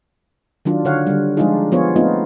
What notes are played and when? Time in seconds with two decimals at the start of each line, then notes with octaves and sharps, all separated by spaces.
0.65 D#3 F#3 D4 F4
0.85 D3 C#5 F5 F#5
1.07 D3 G3
1.37 F3 G#3 D4 D#4 F4 G#4
1.72 F3 B3 F4 G#4 C#5
1.96 A3 B3 C4 D#4 F4